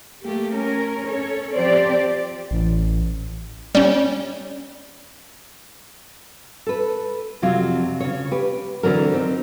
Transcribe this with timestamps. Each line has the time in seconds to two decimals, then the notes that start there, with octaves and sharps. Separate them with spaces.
0.24 A3 A#3 G4
0.55 C#4 A#4
1.08 C#4 A4 C#5
1.55 F3 C4 G4 C5 D5
2.51 A1
3.75 G3 C#4
6.66 A4 B4
7.42 F2 C3 F#3 F4
8.00 C#3 C#5
8.31 G4 B4
8.83 D3 E3 F#3 C4 A#4
9.14 C4 D#4